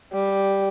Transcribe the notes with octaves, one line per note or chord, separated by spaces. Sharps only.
G3